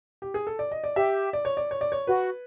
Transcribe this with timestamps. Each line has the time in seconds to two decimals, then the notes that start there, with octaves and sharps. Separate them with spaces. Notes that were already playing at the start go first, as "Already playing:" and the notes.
0.22 G4
0.34 G#4
0.47 A4
0.59 D5
0.71 D#5
0.84 D5
0.96 G4 E5
1.33 D5
1.45 C#5
1.57 D5
1.71 C#5
1.81 D5
1.92 C#5
2.07 F#4 B4